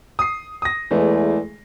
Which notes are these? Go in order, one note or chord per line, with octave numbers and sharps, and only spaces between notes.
D#6 C7
D#6 A#6
E2 E3 G#3 A3